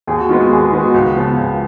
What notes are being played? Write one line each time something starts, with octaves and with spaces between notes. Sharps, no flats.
D#2 G#4
F#4
D#3 G#3 B3 F4
F#4
D#2 G#4
G#4
D#3 G#3 B3
F#4
C#2 F#4
C#3 F3 B3
C#2